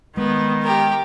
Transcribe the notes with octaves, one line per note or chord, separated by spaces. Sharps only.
D#3 G#3 B3
G4 A#4